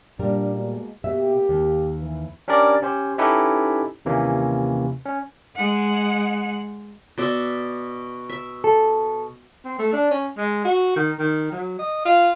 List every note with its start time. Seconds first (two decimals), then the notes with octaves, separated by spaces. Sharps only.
0.19 A#2 G3 D4 A#4
0.55 B2 G#3 A#3
1.04 B2 A#3 C4 G4 E5
1.49 D#2
2.00 E3
2.48 C#4 D4 G4 A#4 D5
2.82 C#4 G4 C5
3.18 C#4 D#4 E4 G4 A4 B4
4.05 D#2 C3 E3 A#3 C#4
5.05 C#4
5.56 G#3 F#5
7.18 B2 D5 E5
8.29 E5
8.64 A4
9.65 C4
9.79 A3
9.93 D4
10.11 C#4
10.37 G#3
10.65 F#4
10.96 D#3
11.19 D#3
11.52 F#3
11.79 D#5
12.05 F4